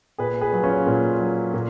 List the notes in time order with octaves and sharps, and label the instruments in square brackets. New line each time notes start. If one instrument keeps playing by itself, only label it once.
[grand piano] A#2 G#4 B4
G#4 B4
F#3
C#4 F4
A#2
F#3
A#2